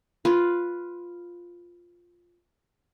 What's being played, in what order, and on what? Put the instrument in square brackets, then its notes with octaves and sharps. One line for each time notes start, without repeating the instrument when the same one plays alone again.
[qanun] F4 B4